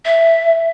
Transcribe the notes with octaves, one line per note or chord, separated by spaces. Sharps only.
E5